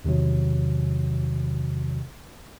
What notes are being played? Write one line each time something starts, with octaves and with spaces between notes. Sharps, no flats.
E2 C3 D#3 F#3